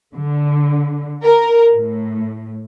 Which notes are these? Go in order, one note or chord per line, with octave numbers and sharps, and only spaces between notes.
D3
A#4
A2